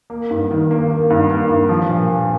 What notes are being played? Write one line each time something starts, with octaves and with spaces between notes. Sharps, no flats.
A#3
G2
D#3
A#3
A#3
G2
A#3
G2
F3
A#2
A#2